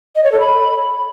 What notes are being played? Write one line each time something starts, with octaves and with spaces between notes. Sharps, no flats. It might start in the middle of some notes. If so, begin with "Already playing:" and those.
D#5
C#5
A4
B5